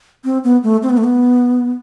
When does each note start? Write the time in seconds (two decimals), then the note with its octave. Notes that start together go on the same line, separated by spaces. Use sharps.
0.25 C4
0.44 B3
0.63 A3
0.83 C4
0.90 B3
0.97 A3
1.04 B3